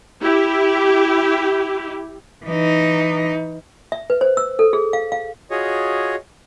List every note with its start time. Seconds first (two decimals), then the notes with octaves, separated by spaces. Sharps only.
0.22 E4 G4
2.46 E3 D#4
3.92 E5
4.10 B4
4.21 C5
4.37 E6
4.59 A4
4.73 G#4
4.93 F5
5.12 F5
5.51 F4 F#4 G#4 C#5 D#5